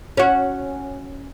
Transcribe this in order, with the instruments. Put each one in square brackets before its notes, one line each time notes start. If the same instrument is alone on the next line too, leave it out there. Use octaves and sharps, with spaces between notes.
[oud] C#4 F#4